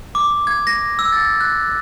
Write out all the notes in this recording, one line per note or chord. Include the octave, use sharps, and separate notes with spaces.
D6
G#6
A#6
E6
A6
F#6